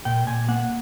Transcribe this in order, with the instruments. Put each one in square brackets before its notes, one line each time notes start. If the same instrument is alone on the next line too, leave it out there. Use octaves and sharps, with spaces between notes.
[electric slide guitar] A#2 G5
A#2 G#5
A#3 F#5